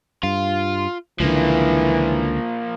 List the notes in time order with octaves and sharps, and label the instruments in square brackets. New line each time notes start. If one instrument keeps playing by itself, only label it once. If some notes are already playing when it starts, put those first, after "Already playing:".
[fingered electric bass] G2 [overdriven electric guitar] F4
[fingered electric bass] C#2 D3 [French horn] E3 [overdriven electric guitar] F3 A#3